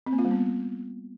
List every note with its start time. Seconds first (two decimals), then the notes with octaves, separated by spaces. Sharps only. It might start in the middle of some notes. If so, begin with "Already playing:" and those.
0.06 C4
0.13 A#3
0.19 F4
0.25 G3
0.31 B3